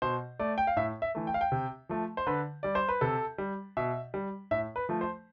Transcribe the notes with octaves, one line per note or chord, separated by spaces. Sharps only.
B2 C5
A3 D5
G5
F5
A2 E5
E5
E3 A3
G5
F5
G5
C3
F3 A3
C5
D3 B4
G3 D5
C5
B4
C3 A4
G3
B2 E5
G3
A2 E5
B4
F3 A3
C5